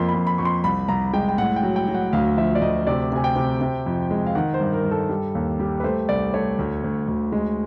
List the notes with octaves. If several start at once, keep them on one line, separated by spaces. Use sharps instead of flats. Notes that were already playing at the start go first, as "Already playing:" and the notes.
Already playing: F2 A#3 C6
B5
F2
B5
F2 C#6
C6
C2 B5
C2 A#5
G#3 G5
G5
A2 F#5
G5
F#3
G5
F#3
F#5
D2 F5
F3 E5
D5
D2 D#5
C3 D5
C3 G#5
G5
C3
C3
F2
G#3
F5
D#3 F#5
C5
G2
A#4
G2
A4
G3
D#2
G3
B4
A3 C5
C2 D5
A3 C#5
D2
D2
D2
G#3